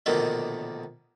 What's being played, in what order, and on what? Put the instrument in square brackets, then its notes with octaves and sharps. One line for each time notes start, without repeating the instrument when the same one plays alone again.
[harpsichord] A#1 B2 D3 D#3 A3